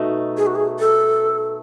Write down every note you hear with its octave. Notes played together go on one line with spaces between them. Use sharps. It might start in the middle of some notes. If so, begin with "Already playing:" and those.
Already playing: B2 A3 D#4
G#4
F#4
G#4
A4